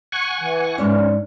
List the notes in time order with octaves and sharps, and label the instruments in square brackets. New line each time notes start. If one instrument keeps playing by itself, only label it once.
[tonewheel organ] F#5 G#5 C#6
[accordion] E3
[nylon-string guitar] G#2 D4 [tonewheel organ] C#4